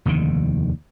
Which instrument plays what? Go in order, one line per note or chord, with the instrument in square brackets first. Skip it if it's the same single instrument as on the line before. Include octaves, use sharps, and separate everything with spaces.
[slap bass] F1 D#2 D3 D#3